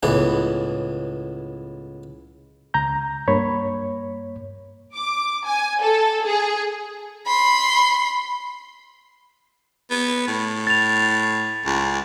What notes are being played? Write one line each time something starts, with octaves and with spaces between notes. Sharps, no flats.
C#2 A2 E3 B3
C#2 A#5 G6
G2 A#3 C#5 B5
D6
G#5
A4
G#4
B5 C6
B3
A2
A6 F7
C#2